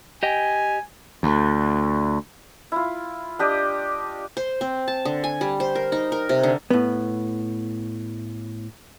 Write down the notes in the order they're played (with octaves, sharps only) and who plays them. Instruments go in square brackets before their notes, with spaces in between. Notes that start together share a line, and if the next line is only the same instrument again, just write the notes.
[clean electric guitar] G4 D#5 G5 [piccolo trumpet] G#5
[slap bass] D2
[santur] E4 F4
D4 G4 D#5
[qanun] C5
C4
A5
D3
G#5
G3
C5
A#4
D#4
A#4
C3
D3
[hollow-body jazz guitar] A2 B3